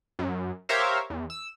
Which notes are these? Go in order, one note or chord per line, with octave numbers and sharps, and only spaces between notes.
F#2
G4 A#4 C5 C#5 E5 F5
E2
E6